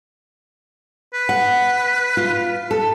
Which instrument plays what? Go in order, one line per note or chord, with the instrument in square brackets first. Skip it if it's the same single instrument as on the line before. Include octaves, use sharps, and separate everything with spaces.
[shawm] B4
[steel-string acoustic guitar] F#5
F4
A4